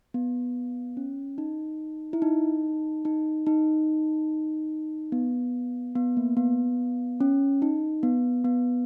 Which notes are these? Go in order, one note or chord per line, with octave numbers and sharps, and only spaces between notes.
B3
C#4
D#4
E4
D#4
D#4
D#4
B3
B3
A#3
B3
C#4
D#4
B3
B3